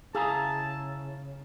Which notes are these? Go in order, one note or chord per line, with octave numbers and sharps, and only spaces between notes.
C#3 E4 G#4 F5 A5 A#5